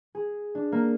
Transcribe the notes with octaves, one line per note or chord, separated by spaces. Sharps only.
G#4
D4
A#3